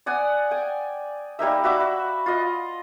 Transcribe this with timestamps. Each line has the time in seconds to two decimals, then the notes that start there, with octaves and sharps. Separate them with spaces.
0.06 D5 F#5 G#5 D#6
0.51 G5 G#5
1.39 G3 A#3 D#4 E5
1.64 F#4 E5 B5 D6
1.80 F#4
2.26 F4 D#5